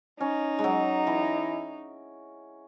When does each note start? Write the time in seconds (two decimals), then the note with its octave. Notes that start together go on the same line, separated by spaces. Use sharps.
0.20 C#4 D#4
0.59 G#3
0.64 F#3
1.07 E3